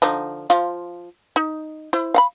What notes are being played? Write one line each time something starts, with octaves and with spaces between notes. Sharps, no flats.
D3 F3 D#4
F3 F4 F5
D#4
E4 C5
F5 F#5 B5